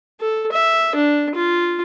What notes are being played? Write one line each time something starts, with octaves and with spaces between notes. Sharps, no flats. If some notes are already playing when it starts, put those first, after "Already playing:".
A4
E5
D4
F4